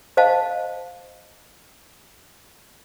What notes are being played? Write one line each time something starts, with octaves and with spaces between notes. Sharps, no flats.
C5 D#5 F5 A5